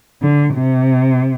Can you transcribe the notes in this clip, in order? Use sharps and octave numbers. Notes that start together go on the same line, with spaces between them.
D3
C3